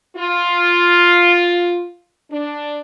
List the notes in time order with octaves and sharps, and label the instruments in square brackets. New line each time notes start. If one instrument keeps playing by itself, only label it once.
[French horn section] F4
D4